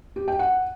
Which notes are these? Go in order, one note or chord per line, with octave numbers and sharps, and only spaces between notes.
G4
G5
F#5